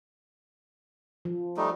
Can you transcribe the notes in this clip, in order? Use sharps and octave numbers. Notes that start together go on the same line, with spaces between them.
F3
G3 A3 D#4